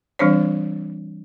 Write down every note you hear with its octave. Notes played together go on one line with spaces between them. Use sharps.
E3 G3 C4 D4 C5 C#5